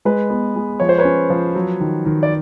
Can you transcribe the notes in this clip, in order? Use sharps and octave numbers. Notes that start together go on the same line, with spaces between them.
G#3 B4
B3
G#3
F3 C#5
C5
B4 C#5
C#4
F3
F#3
D#3
D#3
D5